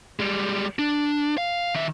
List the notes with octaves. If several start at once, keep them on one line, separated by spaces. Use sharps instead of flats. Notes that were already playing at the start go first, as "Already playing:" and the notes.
G3 G#3
D4
F5
D#3 E5